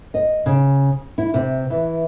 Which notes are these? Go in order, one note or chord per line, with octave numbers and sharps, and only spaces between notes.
D#5
C#3
E4
C3
E3